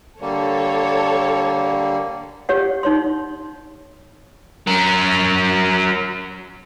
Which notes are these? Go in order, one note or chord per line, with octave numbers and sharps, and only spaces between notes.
D3 G3 A#3 A4 C#5
G4 C#5 F#5
D#4 C#5 C6
F#3 A#4